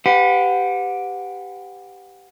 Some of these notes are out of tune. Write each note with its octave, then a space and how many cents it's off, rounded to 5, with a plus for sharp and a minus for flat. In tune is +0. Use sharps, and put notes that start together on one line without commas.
G4 +0 B4 +25 F#5 -30